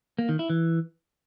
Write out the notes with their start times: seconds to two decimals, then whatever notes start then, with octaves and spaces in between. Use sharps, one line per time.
0.19 A#3
0.29 D#3
0.39 E4
0.50 E3